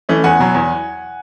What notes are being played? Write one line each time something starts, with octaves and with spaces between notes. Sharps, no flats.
E3 A3 C#4
E2 F#5 G#5
B2 F#3
E2